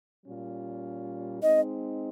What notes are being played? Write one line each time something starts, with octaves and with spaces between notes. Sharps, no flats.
A#2 G3 C#4 F4
G#3 C4 D#4 D#5